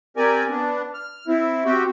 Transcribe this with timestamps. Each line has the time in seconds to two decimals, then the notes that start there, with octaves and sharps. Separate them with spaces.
0.17 C4 G4 A#4 D5 G#5
0.50 B3 D4
0.94 F6
1.27 C4 E4
1.65 C4 F#4 G4